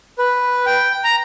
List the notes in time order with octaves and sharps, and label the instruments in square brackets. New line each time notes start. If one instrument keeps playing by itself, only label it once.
[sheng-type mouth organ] B4
G5
A#5